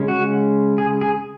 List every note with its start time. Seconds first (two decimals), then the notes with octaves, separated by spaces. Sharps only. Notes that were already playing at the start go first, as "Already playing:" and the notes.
Already playing: C#3 G#3 C#4
0.08 F#4
0.78 G#4
1.01 G#4